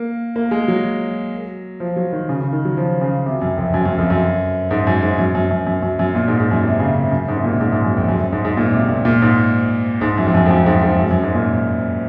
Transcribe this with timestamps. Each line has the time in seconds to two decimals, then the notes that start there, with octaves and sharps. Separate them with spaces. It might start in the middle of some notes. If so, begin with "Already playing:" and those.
Already playing: A#3
0.36 A#3
0.51 G#3
0.68 F#3
1.80 F3
1.96 F#3
2.12 D#3
2.29 C#3
2.41 C#3
2.53 D#3
2.65 F#3
2.77 F3
3.01 C#3
3.26 C3
3.42 F#2
3.58 F2
3.74 F#2
3.85 F#2
3.98 F2
4.10 F#2
4.71 G#2
4.87 F#2
5.03 G#2
5.19 F#2
5.35 F#2
5.51 F#2
5.67 F#2
5.82 F#2
5.99 F#2
6.15 A#2
6.28 G#2
6.40 G#2
6.51 F#2
6.64 C3
6.80 C#3
7.12 F#2
7.28 G#2
7.36 C3
7.44 A#2
7.61 G#2
7.72 G#2
7.84 F#2
7.97 F2
8.08 F#2
8.21 F#2
8.32 G#2
8.45 G#2
8.57 A#2
8.73 C3
8.89 A#2
9.05 A#2
9.22 G#2
10.01 G#2
10.18 F#2
10.26 F2
10.35 F#2
10.46 F2
10.50 F#2
10.66 G#2
10.82 G#2
10.99 F#2
11.11 F#2
11.23 G#2
11.34 A#2